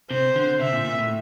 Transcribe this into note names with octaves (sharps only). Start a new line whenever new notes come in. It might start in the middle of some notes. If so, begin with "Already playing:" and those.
C3 C5
D3
C3 E5
A#2
A#2
A2